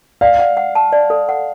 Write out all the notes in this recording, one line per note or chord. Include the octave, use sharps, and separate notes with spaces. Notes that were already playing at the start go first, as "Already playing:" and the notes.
D5 F5
F#5
F#5
A5
D5
A4
F#5